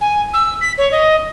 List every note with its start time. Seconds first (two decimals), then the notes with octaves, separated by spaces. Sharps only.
0.01 G#5
0.34 E6
0.61 B6
0.78 C#5
0.92 D#5